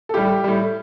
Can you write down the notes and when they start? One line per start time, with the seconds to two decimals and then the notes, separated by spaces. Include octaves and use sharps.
0.09 A4
0.14 A2 G3 G4
0.44 A2 G3